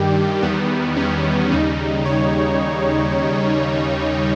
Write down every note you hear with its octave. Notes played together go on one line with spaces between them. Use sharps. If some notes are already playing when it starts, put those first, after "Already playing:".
Already playing: G2 D#3 G3 G4
E2 D#3 G3 B3
C#4
D#2 C#3 G3 D#4
C#5